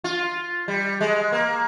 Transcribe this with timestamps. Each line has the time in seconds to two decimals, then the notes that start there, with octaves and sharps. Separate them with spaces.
0.04 F4
0.68 G3
1.01 G#3
1.32 A#3